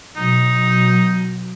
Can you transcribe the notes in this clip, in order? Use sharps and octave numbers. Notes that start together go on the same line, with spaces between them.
B2 F#3 D#4